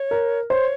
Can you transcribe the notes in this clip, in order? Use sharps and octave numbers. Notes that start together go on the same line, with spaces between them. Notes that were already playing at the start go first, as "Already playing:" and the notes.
Already playing: C#5
A#4
C5 C#5